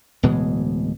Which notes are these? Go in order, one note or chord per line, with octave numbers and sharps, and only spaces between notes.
D1 B2 E3 G#3